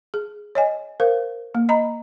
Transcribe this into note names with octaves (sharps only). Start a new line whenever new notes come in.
G#4
C#5 D#5 G#5
A#4 C5 F5
A#3
D#5 A#5 B5